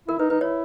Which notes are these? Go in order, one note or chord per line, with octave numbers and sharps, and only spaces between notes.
E4 A#4
D#4 B4
D#4 B4
E4 C#5